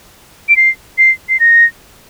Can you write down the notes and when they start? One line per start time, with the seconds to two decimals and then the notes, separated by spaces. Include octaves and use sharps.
0.49 D7
0.57 C7
0.98 C7
1.29 C7
1.40 A#6